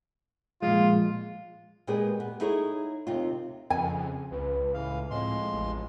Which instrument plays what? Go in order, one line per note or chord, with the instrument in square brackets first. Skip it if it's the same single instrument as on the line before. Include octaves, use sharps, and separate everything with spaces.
[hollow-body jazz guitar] A#2 F3 G#3 [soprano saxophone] F4
[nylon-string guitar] A#2 G#3 B3 G4 G#4
B3
D#4 E4 G#4 A4 C#5
D#2 C3 D#4 F4
[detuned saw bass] F2 [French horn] C#3 [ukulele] G#5
[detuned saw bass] C#2 [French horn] B4
[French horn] A2 [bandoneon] E3 F5
[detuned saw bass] A2 [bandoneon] F3 G#3 C6 [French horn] C4
[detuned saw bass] A1 [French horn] E2